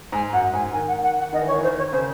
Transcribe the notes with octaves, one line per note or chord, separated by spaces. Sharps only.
G#2 G#5
F#2 F#5
G#2 G#5
D#3 G#5
F#5
F#5
F#5
D#3 D#5
E3
C#5
D#3
E3
C5
D#3
C#5
C#3 C5